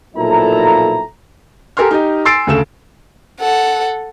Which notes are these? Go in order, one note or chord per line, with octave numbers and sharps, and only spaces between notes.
B1 A#2 F3 E4 A4 A#5
G4 A4 A#4 G#5 C6 F6
D#4 G4 D#5
G#5 C6 E6 A6 C7 D7
D2 C#3 A4 E7
A4 F#5